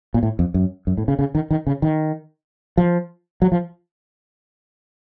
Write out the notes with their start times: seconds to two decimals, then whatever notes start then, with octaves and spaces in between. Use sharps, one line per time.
0.14 A#2
0.23 A2
0.39 F2
0.54 F#2
0.87 F#2
0.98 A2
1.08 C#3
1.19 C#3
1.35 D#3
1.50 D#3
1.67 C#3
1.82 D#3
2.77 F3
3.42 F#3
3.52 F3